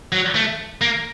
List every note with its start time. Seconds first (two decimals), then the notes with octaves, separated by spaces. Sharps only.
0.12 F#3
0.35 A3
0.81 A#3